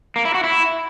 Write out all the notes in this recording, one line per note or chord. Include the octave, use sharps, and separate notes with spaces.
A#3
E4
F#4
E4